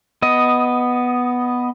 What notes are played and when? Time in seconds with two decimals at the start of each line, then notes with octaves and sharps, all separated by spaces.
0.22 B3 D#5